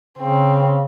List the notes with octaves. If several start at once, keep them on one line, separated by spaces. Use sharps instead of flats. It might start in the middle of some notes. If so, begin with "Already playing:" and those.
C#3 C4